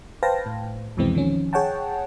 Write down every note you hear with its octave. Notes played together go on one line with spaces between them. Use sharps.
B4 C5 F5 G5 A5 A#6
A2
C2 F2 B2 E3 G#3 C4
D#3 F3 C#4
G#4 C#5 F#5 G5 A5